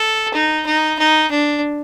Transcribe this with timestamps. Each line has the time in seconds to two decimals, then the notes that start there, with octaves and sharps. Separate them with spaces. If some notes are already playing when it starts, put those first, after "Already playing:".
Already playing: A4
0.34 D#4
0.66 D#4
0.99 D#4
1.31 D4